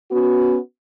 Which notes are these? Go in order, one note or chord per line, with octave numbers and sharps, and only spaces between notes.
B3 C#4 F#4